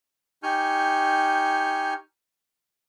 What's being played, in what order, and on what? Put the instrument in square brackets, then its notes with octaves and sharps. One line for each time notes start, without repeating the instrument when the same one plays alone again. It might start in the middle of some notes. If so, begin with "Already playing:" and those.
[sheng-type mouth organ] D#4 G4 G#5 C#6 F6 G6